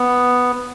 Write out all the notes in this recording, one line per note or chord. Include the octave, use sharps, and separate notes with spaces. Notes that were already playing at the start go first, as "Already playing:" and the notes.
Already playing: B3